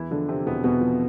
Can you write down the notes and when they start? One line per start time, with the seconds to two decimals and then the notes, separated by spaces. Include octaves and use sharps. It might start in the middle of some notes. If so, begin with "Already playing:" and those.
Already playing: E2 E3 E4
0.11 D3 F3 D4
0.28 C3 C4
0.46 E2 B2 B3
0.64 E2 B2 B3
0.81 F3